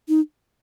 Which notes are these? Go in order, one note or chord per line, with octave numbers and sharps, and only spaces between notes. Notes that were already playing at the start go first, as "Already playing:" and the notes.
D#4